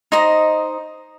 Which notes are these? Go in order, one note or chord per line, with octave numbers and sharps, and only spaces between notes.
D#4 C5 D#5